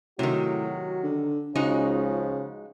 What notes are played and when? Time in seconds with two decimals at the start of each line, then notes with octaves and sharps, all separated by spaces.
0.19 A2 C3 D#3 F#3 F#4
1.03 D3
1.55 C#2 C#3 F3 G#3 D#4 F#4